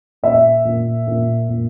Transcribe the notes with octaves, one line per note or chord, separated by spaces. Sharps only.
A#2 E5
A#2
A#2
A#2